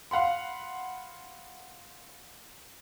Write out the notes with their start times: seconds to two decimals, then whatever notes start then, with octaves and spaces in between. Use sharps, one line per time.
0.11 F5 F#5 B5 C6